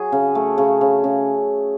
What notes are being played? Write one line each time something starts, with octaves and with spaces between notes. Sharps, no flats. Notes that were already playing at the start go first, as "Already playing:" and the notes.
Already playing: F#3 G#4
C#3
A3
C#3
C#3
C#3